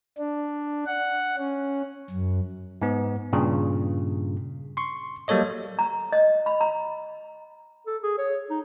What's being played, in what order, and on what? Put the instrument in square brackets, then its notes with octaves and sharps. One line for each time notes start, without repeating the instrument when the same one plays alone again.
[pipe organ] D4
F#5
C#4
F#2
[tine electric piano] G#2 B3
G2 A#2 C#3
C6 C#6
F#3 G3 A#3 A4 C#5 D#5
[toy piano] A#5
D#5
B5
A#5
[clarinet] A4
G#4
C#5
D#4